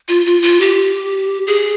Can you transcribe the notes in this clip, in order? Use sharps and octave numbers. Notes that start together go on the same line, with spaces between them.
F4
F4
F4
G4
G#4